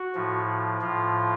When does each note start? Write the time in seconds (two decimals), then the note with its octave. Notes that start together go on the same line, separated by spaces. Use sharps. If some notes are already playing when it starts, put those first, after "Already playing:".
Already playing: F#4
0.15 A2 F3
0.81 A2 F3 F4